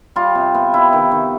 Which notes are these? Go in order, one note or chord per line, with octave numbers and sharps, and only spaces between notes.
G3 F4
C3
B3
G3 E4
D#3
D#3